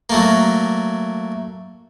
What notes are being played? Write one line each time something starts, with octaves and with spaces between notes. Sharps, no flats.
F#3 A3 A#3